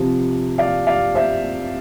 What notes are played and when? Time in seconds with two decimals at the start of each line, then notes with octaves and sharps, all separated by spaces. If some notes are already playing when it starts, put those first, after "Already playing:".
Already playing: C3 F3
0.58 D5 F5
0.87 D5 F5
1.15 C5 E5